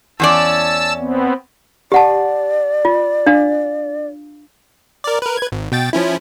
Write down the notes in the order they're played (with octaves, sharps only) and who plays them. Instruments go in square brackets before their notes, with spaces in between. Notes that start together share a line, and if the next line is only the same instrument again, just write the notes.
[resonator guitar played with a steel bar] E2 C#4 D5 [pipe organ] A5 E6
[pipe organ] B3 C4
[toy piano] G4 F#5 A5 [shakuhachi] D5
[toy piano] F4
D4 F5
[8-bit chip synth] A#4 D5
A#4 B4
B4 G#6
G#1
B2 G5 A6
F3 C#4 E4